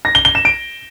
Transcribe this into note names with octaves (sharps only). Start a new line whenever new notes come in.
A#6
G7
G7
E7
D7